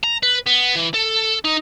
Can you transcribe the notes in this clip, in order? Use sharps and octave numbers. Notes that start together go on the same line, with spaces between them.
A#5
B4
B3
E3
A4
D#4